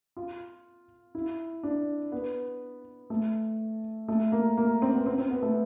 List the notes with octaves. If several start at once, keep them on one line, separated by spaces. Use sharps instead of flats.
F4
E4
D4
B3
A3
A3
A#3
A#3
C4
B3
C4
C4
B3
A3